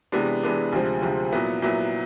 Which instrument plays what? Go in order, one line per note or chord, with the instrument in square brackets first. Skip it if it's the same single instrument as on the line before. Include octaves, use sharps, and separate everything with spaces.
[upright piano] C3 E3 G#3 B3 D4
C3 E3 G#3 B3 D4
D2 C3 F3 G#3 C4
D2 C3 F3 G#3 C4
A#2 F#3 B3 E4
A#2 F#3 B3 E4